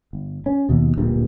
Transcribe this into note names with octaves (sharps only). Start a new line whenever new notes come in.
G1
C#4
D#2 B2
D1 A#1 G2